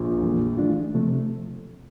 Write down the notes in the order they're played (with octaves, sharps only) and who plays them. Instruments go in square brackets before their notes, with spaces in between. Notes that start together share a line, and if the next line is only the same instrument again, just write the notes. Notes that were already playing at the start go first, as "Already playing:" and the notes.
Already playing: [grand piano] A#1 A#2
[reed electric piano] F2 E3 G3 A#3
E3 A3 D4 F4
C3 F3 A3